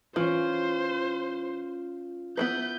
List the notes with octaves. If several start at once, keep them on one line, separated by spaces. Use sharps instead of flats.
E3 C#4 F4 C5
B3 E4 B4 G6